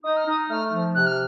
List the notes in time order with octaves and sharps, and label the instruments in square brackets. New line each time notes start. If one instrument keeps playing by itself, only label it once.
[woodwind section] D#4 [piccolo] D#6
[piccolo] F6
[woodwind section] D#4 [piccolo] D#6
[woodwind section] A3 [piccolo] F6
[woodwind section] F3
[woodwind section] C3 [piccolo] F#6
[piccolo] F6